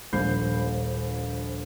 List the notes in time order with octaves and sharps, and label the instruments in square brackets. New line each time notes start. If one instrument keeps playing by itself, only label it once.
[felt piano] D#1 A#1 B5 G6 C7